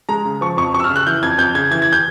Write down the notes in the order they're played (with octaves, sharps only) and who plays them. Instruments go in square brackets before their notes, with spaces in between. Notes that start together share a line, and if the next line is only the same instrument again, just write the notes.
[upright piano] G#3 A#5
C#3
F3 C#6
F2 C#6
F2 C#6
E6
F6
C#3
F#6
E3 G6
F2 G#6
F2 G6
C#3 G#6
E3 G#6
G#6
G6